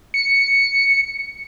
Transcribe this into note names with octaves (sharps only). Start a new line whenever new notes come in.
C#7